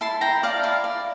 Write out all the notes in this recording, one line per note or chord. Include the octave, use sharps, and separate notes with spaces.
E4 A5 C6
E4 G5 A#5
D5 F5 A5
E4 F5 A5
D5